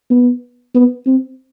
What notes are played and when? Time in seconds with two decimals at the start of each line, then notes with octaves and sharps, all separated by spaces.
0.11 B3
0.75 B3
1.06 C4